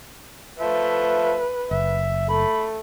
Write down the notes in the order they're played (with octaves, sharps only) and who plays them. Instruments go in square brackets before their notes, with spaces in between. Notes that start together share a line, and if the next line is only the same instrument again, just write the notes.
[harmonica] F3 A3 E5 [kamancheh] B4
[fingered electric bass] F#1 [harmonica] E5
[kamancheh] A3 [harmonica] B5